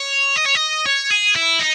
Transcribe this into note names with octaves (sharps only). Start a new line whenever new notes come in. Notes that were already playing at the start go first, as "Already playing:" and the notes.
Already playing: C#5
D#5
C#5
D#5
C#5
G#4
E4
D#4